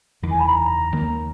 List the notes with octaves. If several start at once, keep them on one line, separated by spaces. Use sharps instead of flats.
F#1 E2 D#3
G#5
B5
A#5
D#2 D#3 A#3